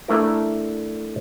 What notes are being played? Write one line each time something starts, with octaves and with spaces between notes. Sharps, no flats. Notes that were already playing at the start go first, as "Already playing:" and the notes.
A3 D4 E4 A#4